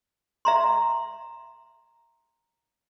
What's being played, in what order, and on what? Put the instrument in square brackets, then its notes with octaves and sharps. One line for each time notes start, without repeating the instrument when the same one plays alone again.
[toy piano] E5 A#5 C6